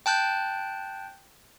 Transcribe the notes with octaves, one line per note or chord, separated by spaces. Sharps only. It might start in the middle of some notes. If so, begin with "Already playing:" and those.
G5 A5 F#6 G6